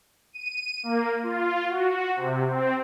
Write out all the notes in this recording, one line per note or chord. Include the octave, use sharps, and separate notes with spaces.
D#7
A#3
F4
F#4
C3
C4